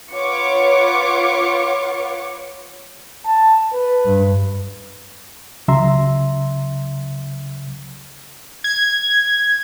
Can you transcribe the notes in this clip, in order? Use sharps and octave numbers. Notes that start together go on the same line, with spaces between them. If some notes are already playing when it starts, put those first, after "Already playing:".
F4 B4 C#5 F#5 C#6 D6
A5
B4
G2
C#2 C#3 F#3 E5 A#5 C6
G#6